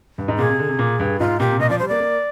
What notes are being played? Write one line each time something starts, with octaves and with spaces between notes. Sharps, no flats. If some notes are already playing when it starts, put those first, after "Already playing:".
G2
G#2
A#2 G#4
C3
D3
C3
A#2
G2
G#2 F4
A#2 G4
C3
A#2 D#5
F3 D5
G3 C5
A#3 D5
A#3